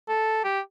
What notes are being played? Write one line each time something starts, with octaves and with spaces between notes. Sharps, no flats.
A4
G4